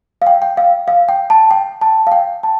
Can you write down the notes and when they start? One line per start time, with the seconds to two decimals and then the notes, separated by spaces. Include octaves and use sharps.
0.22 F5
0.27 G5
0.42 G5
0.57 F5
0.88 F5
1.09 G5
1.30 A5
1.51 G5
1.81 A5
2.07 F5
2.12 G5
2.43 A5